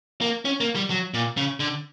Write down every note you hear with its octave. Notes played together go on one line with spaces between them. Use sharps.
A#3
C#4
A#3
G3
F#3
A#2
C#3
D3